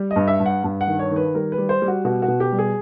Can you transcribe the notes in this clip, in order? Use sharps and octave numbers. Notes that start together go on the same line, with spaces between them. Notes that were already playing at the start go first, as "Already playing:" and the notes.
Already playing: G3
D#5
G2
E5
G2
F#5
G2
F#5
D#3
C#5
D#3 B4
G3 A#4
B4
G3
C5
G3
F#4
B2 F#4
F#4
B2
G4
G3
G#4